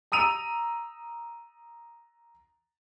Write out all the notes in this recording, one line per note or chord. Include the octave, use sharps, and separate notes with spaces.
A#5 D#6 E6 D#7 F7